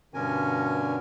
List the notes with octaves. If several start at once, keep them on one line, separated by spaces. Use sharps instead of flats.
G2 B2 D3 C#4 A#4 G#5